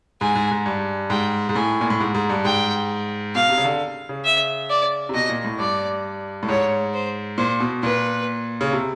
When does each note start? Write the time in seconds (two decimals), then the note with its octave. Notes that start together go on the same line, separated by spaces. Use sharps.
0.21 G#2 G#5
0.35 G#2
0.51 G#2
0.66 G2
1.10 G#2 G5
1.49 G#2
1.55 A2 G#5
1.81 A#2
1.90 A2
2.00 G#2
2.14 G#2
2.29 G2
2.45 G#2 G5
3.35 B2 F5
3.49 C3
3.57 C#3
3.64 D3
4.09 C#3
4.24 E5
4.70 D5
5.09 C3
5.14 B2 D#5
5.29 A#2
5.44 A2
5.59 G2 D5
6.43 A2
6.48 G#2 C#5
6.94 C5
7.38 A#2 C5
7.60 B2
7.83 A#2 B4
8.61 C#3
8.73 C3